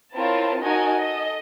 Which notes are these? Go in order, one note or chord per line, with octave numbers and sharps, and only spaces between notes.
C4 E4 F4 A#4 C#5 A5
D#4 F#4 A#4 D#5 G#5 A5
A4 D#5